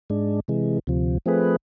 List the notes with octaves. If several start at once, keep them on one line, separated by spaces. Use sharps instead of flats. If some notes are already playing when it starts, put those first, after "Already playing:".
G#2 G#3 D4
C3 E3 G#3
D2 C3 F3
F3 A3 C4 G#4 B4